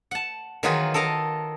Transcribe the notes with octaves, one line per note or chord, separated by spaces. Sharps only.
F#5 A5
D#3 E3 F#3 F4 G#4 B4
A4 A#4 D#5 F5